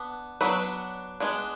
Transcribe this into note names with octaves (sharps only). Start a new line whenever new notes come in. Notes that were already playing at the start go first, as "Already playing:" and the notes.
Already playing: B3 D4
F#3 B3 D4 B4
G#3 B3 D4